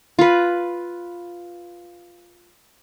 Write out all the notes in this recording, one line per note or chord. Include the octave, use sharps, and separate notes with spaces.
F4 B4